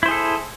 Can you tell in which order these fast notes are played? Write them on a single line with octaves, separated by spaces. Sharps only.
E4 C5 G#4 A4